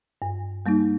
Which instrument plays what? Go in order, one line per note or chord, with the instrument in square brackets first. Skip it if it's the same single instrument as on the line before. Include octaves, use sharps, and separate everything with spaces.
[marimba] G2
G3 A#3 D#4